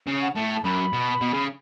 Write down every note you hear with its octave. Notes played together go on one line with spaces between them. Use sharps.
C#3
F#5
A2 A5
A5
F#2 B5
B2
B2
C#3